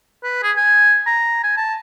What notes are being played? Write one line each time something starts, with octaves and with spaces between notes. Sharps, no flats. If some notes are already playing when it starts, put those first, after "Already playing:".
B4
G#4
G#5
A#5
G#5
A5